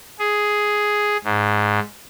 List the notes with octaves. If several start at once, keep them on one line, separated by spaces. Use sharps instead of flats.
G#4
G#2